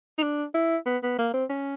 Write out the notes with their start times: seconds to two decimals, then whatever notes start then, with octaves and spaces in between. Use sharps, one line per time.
0.18 D#4
0.23 D4
0.55 E4
0.86 B3
1.03 B3
1.18 A#3
1.34 C4
1.50 C#4